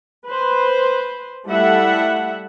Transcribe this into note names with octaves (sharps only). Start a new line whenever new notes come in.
B4 C5
G3 A3 E4 A4 E5 F#5